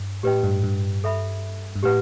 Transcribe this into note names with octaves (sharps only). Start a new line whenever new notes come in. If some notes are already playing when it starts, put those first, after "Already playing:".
Already playing: G2
A2 G4 B4 D#5 G5
G2
G2
A4 E5 B5
G2
A2 G4 B4 F#5